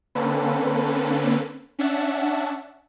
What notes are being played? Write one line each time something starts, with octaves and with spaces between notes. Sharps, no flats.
D3 A#3 C4 C#4 A4 B4
C#4 D4 E5 F#5 A5